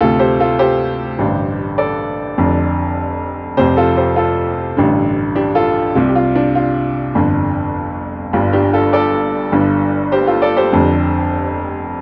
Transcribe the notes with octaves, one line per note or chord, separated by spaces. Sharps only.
D2 C3 F4 A4
G4 C5
F4 A4
G4 C5
A1 G2 D3
A4 D5
F1 F2 D3
F1 F2 C3 G4 C5
F4 A4
G4 C5
F4 A4
A1 G2 D3
D4 G4
F4 A4
C2 C3 F4
G4
F4
D4
F4
G1 F2 D3
G1 G2 D3 F4
D4 G4
F4 A4
A4 D5
G1 G2 D3
G4 C5
F4 A4
A4 D5
G4 C5
F1 F2 D3